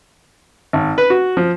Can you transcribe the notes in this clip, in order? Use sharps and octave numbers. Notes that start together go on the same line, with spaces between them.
G#1
B4
F#4
F3